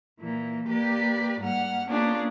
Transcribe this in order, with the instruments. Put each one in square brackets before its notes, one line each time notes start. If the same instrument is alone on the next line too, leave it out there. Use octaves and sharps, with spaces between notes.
[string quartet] A#2 E3 A#3
A#3 G4 B4 D5
G#2 G3 A#3 F#5 F6
A#3 B3 C#4 D4 F4 G#4